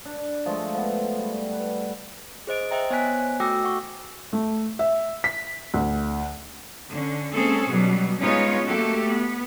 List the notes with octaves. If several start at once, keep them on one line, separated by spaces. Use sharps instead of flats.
D4
F3 G#3 A3
F3 B3
G3
B4
G#4 C5 D#5 D7
C5 D#5 E5 G5 A#5
B3 C5 C#5 G#5 F#6 B6
A3 F#4 G5 D6 E6 A#6
F#5 C#6
A3
E5
B6
D2
D3 C#4
G#3 A#3 C4 C#4 G#4 A4
B2 F#3 G3
G#3 B3 C#4 D#4 F4 C#5
A3 A#3 F#4 G4 A4
B3